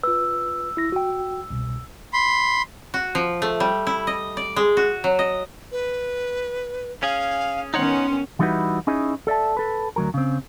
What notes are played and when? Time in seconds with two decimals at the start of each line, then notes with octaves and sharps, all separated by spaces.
0.04 F4 B4 E6
0.77 E4 A#6
0.92 F#4 G5
1.50 C2 B2
2.13 B5 C6
2.94 F#4
3.15 F3
3.42 A3
3.60 G3
3.87 E4
4.07 D#5
4.37 D5
4.56 G#3
4.77 F#4
5.04 F#3
5.19 D#5
5.72 B4
7.03 C#4 G#4 F5
7.74 D#3 B3 C#4 D#4 C#5 F#5 C6
8.39 E3 G3 D#4 E4 F#4 B4
8.87 C#4 D#4 E4 G#4 D#5
9.27 A4 D5 E5 A5
9.57 A4 B4
9.96 D2 F#3 A#4
10.14 C#3 C4